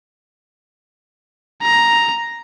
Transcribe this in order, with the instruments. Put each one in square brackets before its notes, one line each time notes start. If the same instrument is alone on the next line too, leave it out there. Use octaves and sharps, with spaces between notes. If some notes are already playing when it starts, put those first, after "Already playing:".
[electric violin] A#5